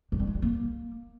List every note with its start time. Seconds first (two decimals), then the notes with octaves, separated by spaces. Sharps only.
0.12 F#3
0.20 G3
0.27 G#3
0.35 F4
0.42 A#3